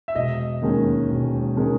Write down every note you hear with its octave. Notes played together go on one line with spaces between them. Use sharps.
E5
E1 D#5
D#2 D#3 G#3 C#4
E1
D#3 G#3 C#4